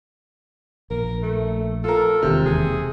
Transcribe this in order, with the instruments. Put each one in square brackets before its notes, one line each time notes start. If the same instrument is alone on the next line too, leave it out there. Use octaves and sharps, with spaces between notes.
[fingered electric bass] A#1 [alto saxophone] A#4
[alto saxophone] A3
[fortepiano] F4 A#4 [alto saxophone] A4
[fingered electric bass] E1 D#2 D#3 [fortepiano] C3
[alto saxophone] G#4